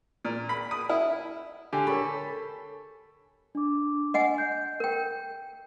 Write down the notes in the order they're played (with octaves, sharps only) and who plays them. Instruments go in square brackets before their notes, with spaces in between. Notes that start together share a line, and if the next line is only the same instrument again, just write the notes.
[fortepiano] A#2
B5
D#6
E4
[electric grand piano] D3 G4 [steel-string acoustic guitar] G#5
[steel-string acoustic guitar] A4 [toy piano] A#4 C#5 C#6 [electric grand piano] B5
[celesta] D4 D6
[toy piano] D#5 F#5 G#5
[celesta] G6
[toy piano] A#4 G5